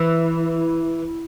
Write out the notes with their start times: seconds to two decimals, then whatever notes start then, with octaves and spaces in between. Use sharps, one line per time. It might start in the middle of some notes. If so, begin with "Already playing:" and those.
Already playing: E3